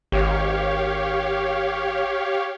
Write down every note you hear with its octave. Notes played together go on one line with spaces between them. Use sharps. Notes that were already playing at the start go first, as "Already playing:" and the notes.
G#1 G4 C#5 F5